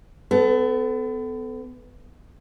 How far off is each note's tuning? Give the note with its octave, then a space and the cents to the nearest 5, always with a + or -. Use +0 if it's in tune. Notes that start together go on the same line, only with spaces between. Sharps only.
B3 +35 A4 -10